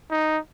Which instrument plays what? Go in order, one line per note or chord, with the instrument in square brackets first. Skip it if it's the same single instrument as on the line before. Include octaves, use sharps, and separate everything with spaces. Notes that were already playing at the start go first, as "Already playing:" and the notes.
[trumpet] D#4